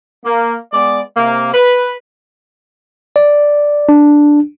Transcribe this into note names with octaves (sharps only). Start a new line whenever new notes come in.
A#3
G#3 B3 D5
C3 A#3
B4
D5
D4